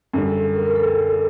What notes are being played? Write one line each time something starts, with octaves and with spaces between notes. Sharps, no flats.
F#2 D3 G3 G#4
A4
A#4
A#4
A4